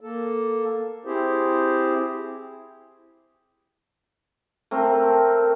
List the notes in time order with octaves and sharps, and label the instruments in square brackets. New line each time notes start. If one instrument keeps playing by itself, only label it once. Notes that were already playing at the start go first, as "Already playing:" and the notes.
[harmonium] A#3 A4
C4 E4 G4 G#4 C5
[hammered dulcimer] A3 C4 A#4